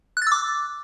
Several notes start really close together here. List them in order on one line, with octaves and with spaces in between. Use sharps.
F#6 A6 E6 D6